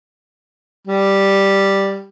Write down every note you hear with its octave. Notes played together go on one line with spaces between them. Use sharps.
G3